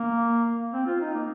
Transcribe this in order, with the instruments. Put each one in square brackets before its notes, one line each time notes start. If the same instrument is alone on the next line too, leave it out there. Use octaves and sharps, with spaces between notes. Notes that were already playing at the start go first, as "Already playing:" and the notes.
Already playing: [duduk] A#3
C4
F4
D#4
A#3